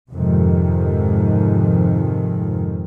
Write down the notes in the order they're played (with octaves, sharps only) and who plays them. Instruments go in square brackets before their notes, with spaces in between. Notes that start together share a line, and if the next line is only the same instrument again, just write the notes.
[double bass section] F2 G#2 C3 D#3